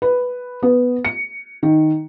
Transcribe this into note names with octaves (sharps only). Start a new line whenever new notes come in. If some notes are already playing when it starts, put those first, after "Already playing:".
B4
B3
C#7
D#3